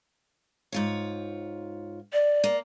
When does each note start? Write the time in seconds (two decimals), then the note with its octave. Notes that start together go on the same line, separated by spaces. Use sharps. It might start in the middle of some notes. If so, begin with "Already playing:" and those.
0.72 G#2 F4 C#5
2.13 D5
2.44 A#3